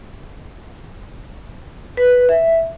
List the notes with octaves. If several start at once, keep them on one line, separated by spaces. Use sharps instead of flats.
B4
E5